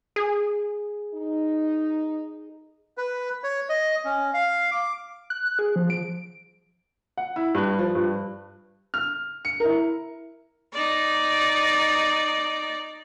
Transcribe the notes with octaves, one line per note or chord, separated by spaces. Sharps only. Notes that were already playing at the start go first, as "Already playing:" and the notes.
G#4
D#4
B4
C#5
D#5
C#4
F5
D6
F#6
F#6
G#4
F3
D7
F#5
E4
G2
F3
G2
F6
C#7
E4 A#4
D#4 D5